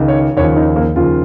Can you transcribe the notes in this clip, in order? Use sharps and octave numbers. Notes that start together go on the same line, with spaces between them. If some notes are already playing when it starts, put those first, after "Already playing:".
Already playing: C#2 D#3
C#5
D#2 C#3 F3 C#5
D#4
A#3
D#2 C#3 F3 F4